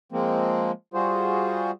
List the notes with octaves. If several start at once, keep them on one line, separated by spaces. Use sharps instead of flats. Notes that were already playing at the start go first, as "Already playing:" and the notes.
F3 G#3 A#3 C4
G3 F4 F#4 G#4 C5